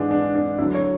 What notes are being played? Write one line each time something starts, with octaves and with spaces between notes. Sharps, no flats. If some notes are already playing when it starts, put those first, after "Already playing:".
Already playing: G#2 E3 G#3 D4
D4
D4
D2 D3 F#3 E4
C#5